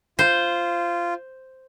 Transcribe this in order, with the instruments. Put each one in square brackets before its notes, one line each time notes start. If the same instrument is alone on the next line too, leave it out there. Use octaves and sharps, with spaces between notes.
[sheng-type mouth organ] F4 [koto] C5